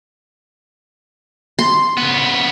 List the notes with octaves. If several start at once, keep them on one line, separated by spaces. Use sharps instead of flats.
C6
C#3 B3